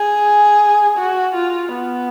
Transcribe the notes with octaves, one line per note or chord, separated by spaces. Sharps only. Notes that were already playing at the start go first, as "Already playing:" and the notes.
Already playing: G#4
F#4
F4
B3